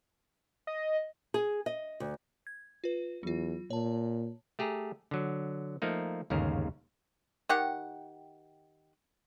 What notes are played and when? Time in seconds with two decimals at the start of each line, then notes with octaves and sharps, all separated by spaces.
0.67 D#5
1.34 G#4
1.66 D#5
2.00 D2
2.47 G#6
2.84 F4 B4
3.23 E2 F#3 F4
3.70 A#2 C#5 A5
4.59 A3 G4 G#4 A#5
5.11 D3 F#3
5.82 F3 A3 A#3 D#4
6.30 G1 D#2 G#2 C#3 A#4
7.49 D#3 G4 F#5